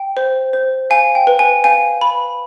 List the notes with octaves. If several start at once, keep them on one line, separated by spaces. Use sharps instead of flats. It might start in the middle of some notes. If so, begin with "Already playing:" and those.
Already playing: G5
C5
C5
F5 G#5
G5
B4
G#5
F5 G#5
B4 B5